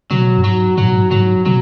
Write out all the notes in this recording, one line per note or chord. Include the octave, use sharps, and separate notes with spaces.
B2 F#3
F#2
G#2 F#3
G#2 F#3
B2
G#2
G#2 F#3
B2 F#3